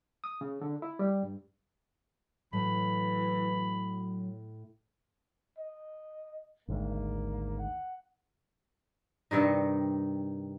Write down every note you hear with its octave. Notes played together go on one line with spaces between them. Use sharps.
D#6
C#3
D3
E4
G3
G2
A2 E3 F#3 B5
D#5
G#1 D2 G#2 A#3
F#5
G2 C3 D#3 D#4